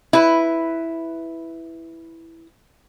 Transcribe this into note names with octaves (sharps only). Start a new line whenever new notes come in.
E4 B4